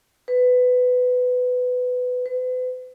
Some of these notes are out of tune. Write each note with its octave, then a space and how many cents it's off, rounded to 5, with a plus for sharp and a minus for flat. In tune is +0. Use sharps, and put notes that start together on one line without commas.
B4 +15
B4 +40